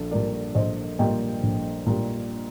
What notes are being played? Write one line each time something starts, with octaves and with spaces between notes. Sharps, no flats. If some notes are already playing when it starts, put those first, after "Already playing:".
Already playing: A#1 A4
A#2 G3 A#3 A#4 D5
A#1 C5 D#5
A#2 G3 A#3 D#5 G5
A#1
A#2 G3 A#3